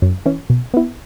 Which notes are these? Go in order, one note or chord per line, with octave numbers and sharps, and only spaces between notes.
F#2
E3 C#4
B2
B3 E4